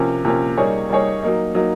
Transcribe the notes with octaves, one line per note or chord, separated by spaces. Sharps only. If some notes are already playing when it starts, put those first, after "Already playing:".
Already playing: C3 F3 A#3 C#4
C3 F3 A#3 C#4
G3 A#3 D#4 G#4 C#5
G3 A#3 D#4 G#4 C#5
F#3 A#3 D#4
F#3 A#3 D#4